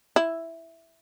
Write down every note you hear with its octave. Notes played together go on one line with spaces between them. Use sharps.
E4